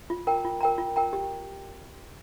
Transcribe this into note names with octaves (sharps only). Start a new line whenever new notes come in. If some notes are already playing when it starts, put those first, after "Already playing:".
F4
A#4 G5 A#5
F4
A#4 G5 A#5
F4
A#4 G5 A#5
G4